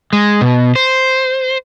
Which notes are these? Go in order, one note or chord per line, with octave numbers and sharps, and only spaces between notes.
G#3
B2
C5